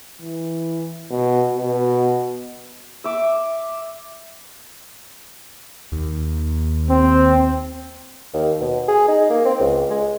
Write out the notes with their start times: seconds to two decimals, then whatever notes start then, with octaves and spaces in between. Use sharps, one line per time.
0.21 E3
1.11 B2
1.56 B2
3.04 E5 D6
5.92 D#2
6.90 C4
8.34 D#2
8.61 B2
8.89 G#4
9.08 D#4
9.30 A#3
9.45 C4
9.60 C#2
9.90 G#3